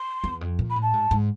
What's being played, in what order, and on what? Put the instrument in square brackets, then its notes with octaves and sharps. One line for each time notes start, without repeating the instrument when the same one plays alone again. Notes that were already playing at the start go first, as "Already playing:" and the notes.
Already playing: [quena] C6
[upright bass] E2
F2
A#2
[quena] B5
[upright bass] A2
[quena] A5
[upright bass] G#2
G#2